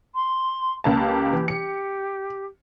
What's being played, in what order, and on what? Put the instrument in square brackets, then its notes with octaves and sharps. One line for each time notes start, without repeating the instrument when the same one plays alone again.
[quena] C6
[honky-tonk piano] C#2 A#3 A5
[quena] G4
[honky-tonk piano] E3
[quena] G4 [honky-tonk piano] C#7